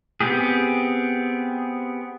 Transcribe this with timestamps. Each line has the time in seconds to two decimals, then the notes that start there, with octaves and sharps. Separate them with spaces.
0.20 B3 C4 G4 G#4